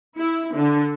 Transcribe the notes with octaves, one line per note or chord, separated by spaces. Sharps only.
E4
D3